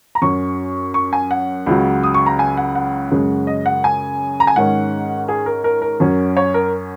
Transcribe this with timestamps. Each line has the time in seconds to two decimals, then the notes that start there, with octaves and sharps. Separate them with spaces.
0.15 A#5
0.22 F#2 F#3 C#4 C#6
0.94 C#6
1.13 G#5
1.31 F#5
1.66 C#2 C#3 F#3
2.03 D#6
2.14 C#6
2.26 A#5
2.39 G#5
2.57 F#5
2.75 F#5
3.11 F#2 C#3 G#3 C#4
3.47 D#5
3.66 F#5
3.84 G#5
4.40 A#5
4.47 G#5
4.56 G#2 D#3 G#3 C#4 F#5
5.29 G#4
5.46 A#4
5.64 A#4
5.82 A#4
6.00 F#2 F#3 C#4
6.37 C#5
6.54 A#4